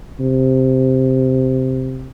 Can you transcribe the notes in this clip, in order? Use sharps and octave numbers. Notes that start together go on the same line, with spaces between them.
C3